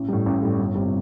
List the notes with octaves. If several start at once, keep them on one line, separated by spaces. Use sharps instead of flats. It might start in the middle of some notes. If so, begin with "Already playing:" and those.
Already playing: A1
A2 G3
A1
A2 G3
G1
C3 G3